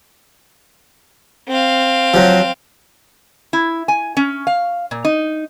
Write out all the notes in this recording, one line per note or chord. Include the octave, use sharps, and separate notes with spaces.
C4 F5
F3 F#3
E4
G#5
C#4
F5
A#2
D#4